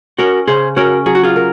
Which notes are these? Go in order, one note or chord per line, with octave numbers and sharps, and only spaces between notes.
C#4 F#4 A#4
C#3 G#4 C5
C#4 F#4 A#4
F#3 G#4
F#4
F4 G#4
A#4